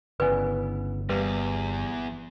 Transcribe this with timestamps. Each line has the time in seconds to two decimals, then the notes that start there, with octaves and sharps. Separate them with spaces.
0.20 G1 C#3 E3 B3 B4 D5 G#5
1.09 E2 G3 A#3 B4